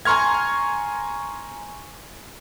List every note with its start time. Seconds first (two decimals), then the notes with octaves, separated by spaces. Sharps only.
0.05 G#5 A#5 C6 C#6 F6 G#6